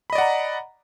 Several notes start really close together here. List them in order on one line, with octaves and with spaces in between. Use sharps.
B5 D#5 D5 F#5 A#5